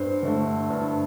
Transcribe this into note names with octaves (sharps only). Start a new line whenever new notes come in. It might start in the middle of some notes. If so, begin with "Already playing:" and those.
Already playing: G2 C5
D3 A3
G2